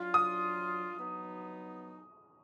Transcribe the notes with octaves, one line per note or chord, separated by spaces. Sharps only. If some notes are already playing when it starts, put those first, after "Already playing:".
Already playing: F#3 D4 F4
D#6
F#3 B3 D#4